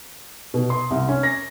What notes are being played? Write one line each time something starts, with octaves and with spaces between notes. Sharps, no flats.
B2
C6
C2
C#4
A#6